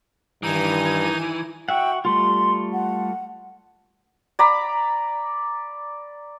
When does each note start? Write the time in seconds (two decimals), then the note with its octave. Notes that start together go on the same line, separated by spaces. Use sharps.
0.43 G2 D#3 E3 D#4 G#5 D#7
1.69 F#4 E5 F#5 G5
2.05 G3 A3 F4 C6
2.73 F#5
4.39 D5 A#5 B5